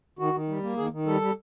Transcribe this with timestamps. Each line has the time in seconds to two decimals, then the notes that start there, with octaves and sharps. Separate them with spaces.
0.19 D#3 F#4
0.34 D#3
0.48 G3
0.63 A#3
0.77 D#3 G#4
0.92 D#3
1.06 G3 A4
1.21 G3